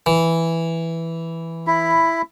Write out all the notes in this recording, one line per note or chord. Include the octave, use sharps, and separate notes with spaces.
E3
E4 B5